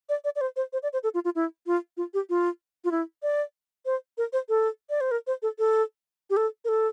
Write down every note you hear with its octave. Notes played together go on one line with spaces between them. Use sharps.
D5
D5
D5
C5
C5
C5
D5
C5
A4
F4
F4
E4
F4
F4
G4
F4
F4
E4
D5
C5
A#4
C5
A4
D5
C5
A#4
C5
A4
A4
G4
A4
A#4
A4